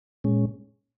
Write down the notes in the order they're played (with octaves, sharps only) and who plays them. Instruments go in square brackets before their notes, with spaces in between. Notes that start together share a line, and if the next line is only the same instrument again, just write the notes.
[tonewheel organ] A#2 G#3 C#4